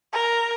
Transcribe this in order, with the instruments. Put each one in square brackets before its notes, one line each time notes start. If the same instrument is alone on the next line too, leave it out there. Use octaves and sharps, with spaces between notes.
[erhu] A#4